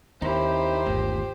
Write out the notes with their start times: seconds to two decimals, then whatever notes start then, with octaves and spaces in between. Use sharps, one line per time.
0.22 D#2 C4 D#4 E4 G4 C5
0.86 G1 D2 A#2 D3